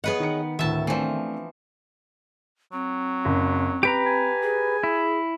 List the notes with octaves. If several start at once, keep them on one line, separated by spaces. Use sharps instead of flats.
B3 G#4 B4 C#5 D#5 F#5
D#3 D#4 C#7
D2 A2 D#3 E5 A5
E3 F3 A3 C4 D4
F#3 C4
F#1
G4 B4 A#5 D7
G#5
G#4
E4